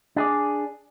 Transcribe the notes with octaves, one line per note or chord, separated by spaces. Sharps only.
D4 G#4 D5